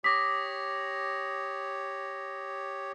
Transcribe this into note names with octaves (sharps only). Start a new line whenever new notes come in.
G4 C#5 D6 D#6 A#6 B6